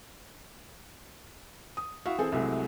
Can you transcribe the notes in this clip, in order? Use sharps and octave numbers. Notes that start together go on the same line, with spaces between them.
D#6
E4 F#4 E5 F5
E3 C4 G#4 A4
C2 C3 F#3 G#3 A3